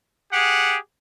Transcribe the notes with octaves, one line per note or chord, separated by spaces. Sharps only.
G4 G#4 F#5